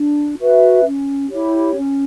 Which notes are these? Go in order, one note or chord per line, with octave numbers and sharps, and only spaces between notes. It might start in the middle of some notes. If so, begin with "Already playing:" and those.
Already playing: D4
F#4 B4 E5
C#4
E4 G4 C#5
C#4